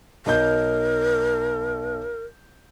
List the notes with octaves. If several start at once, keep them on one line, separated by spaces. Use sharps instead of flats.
B1 D#4 A#4 G6